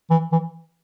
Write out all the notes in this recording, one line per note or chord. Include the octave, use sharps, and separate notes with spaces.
E3
E3